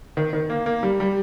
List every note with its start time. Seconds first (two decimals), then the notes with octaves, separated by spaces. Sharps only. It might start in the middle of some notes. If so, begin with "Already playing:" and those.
0.17 D#3
0.33 D#3
0.50 A#3
0.66 A#3
0.83 G3
1.00 G3